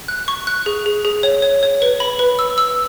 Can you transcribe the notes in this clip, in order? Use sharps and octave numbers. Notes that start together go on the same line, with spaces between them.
F#6
C#6
F#6
G#4
G#4
G#4
C#5
C#5
C#5
B4
B5
B4
E6
E6